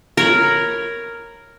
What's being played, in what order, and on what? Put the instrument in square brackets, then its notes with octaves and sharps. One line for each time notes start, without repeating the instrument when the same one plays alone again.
[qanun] A#4 C#5 B5